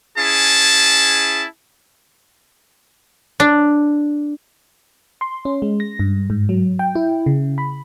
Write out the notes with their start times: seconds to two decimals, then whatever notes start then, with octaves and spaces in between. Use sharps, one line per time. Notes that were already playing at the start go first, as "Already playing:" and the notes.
0.18 C#4 E4 G#4 A5
3.40 D4
5.21 C6
5.45 C#4
5.62 G#3
5.80 A#6
5.99 G2
6.30 G#2
6.49 F#3
6.79 G5
6.95 E4
7.26 C#3
7.58 B5